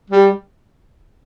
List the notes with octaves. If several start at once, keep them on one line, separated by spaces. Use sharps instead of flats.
G3